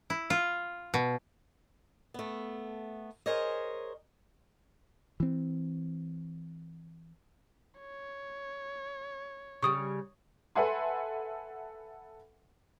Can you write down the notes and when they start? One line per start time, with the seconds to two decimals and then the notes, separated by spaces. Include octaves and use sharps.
0.10 E4
0.30 F4
0.94 B2
2.14 A3 B3
3.26 G#4 A#4 C5 C#5 D#5
5.20 E3 C4
7.80 C#5
9.63 C#3 G3 C#6 D#6
10.55 A4 B4 E5 F#5 G#5 C6